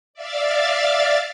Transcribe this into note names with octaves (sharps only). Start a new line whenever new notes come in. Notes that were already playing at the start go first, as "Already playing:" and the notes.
D5 E5 F5 A6